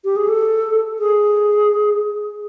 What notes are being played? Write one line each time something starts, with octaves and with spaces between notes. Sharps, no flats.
G4
G#4
A4
G#4